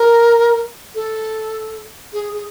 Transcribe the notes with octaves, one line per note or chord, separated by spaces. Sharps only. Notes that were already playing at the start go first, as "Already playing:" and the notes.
Already playing: A#4
A4
G#4
G#4